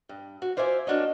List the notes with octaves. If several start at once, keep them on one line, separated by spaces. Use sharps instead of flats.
G2
F#4
F4 C5 D5 E5 G#5
A#3 D4 F#4 A4 C#5 D#5